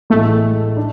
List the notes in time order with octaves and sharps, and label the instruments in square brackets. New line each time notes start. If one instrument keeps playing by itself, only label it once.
[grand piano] A1 A2 G#3 [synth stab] A3
[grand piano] D4